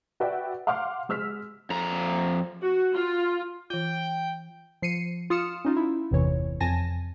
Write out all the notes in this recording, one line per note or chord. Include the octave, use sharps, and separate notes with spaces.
F#4 B4 D5 E5 G5
F5 F#5 C6 D6 F6
G#3 E6 F6 B6
F2 A#5
F#4
F4
E3 F4 G5
F3 C7 C#7 D#7
F4 D#6 F6 C#7 E7
C#4 D#4 F4
E4
G1 E2 C3 E3 C#5
F2 G#5 A5 A#6